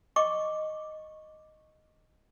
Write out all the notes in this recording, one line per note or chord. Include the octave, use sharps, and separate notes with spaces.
D#5 C#6 D6